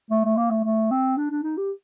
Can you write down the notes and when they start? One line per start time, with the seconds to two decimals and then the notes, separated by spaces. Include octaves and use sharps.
0.10 A3
0.25 A3
0.37 A#3
0.51 A3
0.64 A3
0.91 C4
1.17 D4
1.30 D4
1.43 D#4
1.57 G4